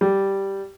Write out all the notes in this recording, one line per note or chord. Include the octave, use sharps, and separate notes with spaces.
G3